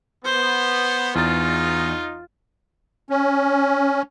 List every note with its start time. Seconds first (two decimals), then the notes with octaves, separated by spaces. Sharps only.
0.25 B3 C5
1.15 E2 D#4 F4 A6
3.10 C#4